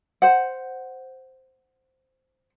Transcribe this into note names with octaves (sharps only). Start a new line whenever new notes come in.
C5 F#5